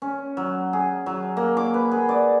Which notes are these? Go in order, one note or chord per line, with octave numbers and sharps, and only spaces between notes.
C#4
F#3
G#4
F#3
A#3
D6
B4
G#4
D5